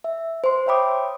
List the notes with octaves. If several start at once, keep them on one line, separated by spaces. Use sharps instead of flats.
E5
C5 C6
C#5 E5 G5 B5 D6 D#6